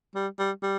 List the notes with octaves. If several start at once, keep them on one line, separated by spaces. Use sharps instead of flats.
G3
G3
G3